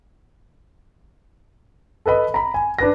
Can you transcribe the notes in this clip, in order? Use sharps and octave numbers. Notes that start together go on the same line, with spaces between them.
A4 B4 D#5 B5
A#5 B5
G#5
D4 B4 A#6